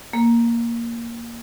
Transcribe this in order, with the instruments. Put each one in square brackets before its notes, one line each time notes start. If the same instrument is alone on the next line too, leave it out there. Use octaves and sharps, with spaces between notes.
[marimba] A#3